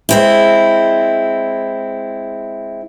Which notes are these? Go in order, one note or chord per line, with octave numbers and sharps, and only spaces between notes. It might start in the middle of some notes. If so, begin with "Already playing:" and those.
G#3 C4 E4